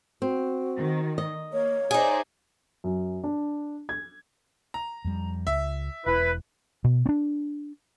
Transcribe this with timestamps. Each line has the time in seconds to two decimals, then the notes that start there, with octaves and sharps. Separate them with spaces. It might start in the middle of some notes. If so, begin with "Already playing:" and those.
0.22 C4 F#4
0.77 D#3
1.18 D#5
1.53 A#3 C#5
1.91 D#4 G#4 C5 D5 E5
2.84 F#2
3.24 D4
3.89 G#6
4.74 A#5
5.05 F2 G3
5.47 C#2 E5
6.06 E1 E4 B4
6.84 B2
7.06 C4 D4